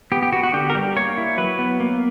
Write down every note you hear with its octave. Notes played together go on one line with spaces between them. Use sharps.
B3 G4
G4
B3 F#4
F#4
D3 G4
A#4
G3 G4
A#3 C#5
E4
F#3 B4
B3
A#3